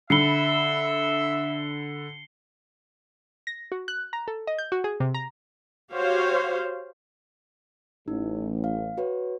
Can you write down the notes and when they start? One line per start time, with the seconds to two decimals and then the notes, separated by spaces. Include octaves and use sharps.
0.10 D3 E5 B5 C7 C#7 G7
3.47 A#6
3.72 F#4
3.88 F#6
4.13 A#5
4.28 A4
4.47 D#5
4.58 G6
4.72 F#4
4.84 G#4
5.00 C3
5.14 A#5
5.93 F#4 G4 C5 C#5 F5
8.08 A1 D#4
8.64 F5
8.98 F#4 B4 C#5